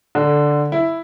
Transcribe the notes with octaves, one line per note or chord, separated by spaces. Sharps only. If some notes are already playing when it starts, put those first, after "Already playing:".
D3
E4